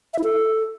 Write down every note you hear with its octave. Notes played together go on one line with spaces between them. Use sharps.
E5
E4
A4